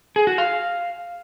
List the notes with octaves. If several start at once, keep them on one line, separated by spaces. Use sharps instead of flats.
G#4
F#4
F5